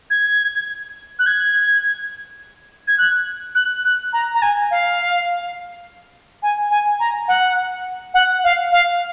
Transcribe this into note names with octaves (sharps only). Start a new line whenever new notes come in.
G#6
F#6
G#6
G#6
F#6
F#6
F#6
A#5
A#5
G#5
F5
G#5
G#5
A#5
F#5
F#5
F5
F5